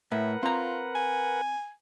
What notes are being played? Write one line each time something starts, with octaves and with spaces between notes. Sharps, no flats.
A2 A#4 B4 E5 F#5
C4 F4 A#5
G#5